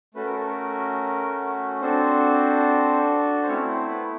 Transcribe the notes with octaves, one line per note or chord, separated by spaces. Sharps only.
A3 C#4 F#4 A4 B4
A#4
A4
A#4
C4 D4 F#4 A4 C5
C5
A3 C4 C#4 E4 C#5
C4 C5
B3 B4